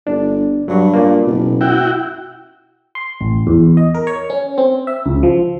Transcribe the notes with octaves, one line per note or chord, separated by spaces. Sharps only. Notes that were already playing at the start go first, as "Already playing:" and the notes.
G1 D4
G2 F#3 C#6
A#3 F4 D5
F#1 B2
E4 F#4 G5
C6
A1
E2
D#5
A#4
C#5
C#4
C4
E5
C#2
F3